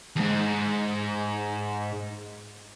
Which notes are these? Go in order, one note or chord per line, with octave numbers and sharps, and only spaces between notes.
D#2 G#2